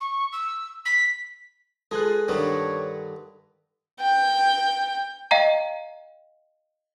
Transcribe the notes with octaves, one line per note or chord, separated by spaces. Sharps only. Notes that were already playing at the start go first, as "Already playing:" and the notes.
C#6
E6
B6
G#3 F4 G#4 A4 B4 F#6
G2 D3 D#3 D4 B4 C#5
G5
D#5 F5 G5 A#5